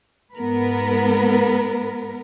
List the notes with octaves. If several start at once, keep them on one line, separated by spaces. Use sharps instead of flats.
G#2 B3 A#4 B4